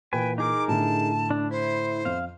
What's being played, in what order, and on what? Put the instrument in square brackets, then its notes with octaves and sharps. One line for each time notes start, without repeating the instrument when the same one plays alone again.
[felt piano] A#2 E3 [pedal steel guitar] B4 G#5 [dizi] G5
[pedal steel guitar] D#4 G#4 A#4 [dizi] D6
[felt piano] A2 D3 [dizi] A5
[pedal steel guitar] D4
[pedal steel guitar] E4 [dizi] C5
[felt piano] F2 [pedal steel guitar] F5